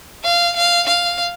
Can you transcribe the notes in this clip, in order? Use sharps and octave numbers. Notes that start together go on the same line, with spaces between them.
F5
F5
F5